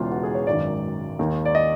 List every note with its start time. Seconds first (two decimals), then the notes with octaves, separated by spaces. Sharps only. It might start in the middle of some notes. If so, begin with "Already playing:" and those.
Already playing: E1 E2 C#3 E3 F4
0.11 F#4
0.23 G#4
0.34 C#5
0.47 G#1 F#2 D#3 D5
1.19 D#2 D#3
1.45 D5
1.55 D#5